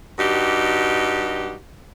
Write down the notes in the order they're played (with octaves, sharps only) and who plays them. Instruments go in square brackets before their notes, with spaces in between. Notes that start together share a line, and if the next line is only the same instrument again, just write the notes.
[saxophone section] G2 D#4 F#4 G4